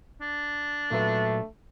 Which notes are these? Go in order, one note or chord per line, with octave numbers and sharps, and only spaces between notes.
D4
A#2 F#3 A3 B4